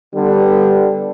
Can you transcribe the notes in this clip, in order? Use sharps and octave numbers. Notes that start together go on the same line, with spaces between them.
D3 G3 B3